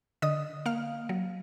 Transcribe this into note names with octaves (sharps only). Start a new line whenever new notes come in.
D3 D#5 D#6
A#3 F5 F6
F#3